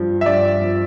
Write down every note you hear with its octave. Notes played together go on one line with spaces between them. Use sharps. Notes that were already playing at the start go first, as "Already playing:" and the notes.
Already playing: G2 F3
E5
G2 D5
F3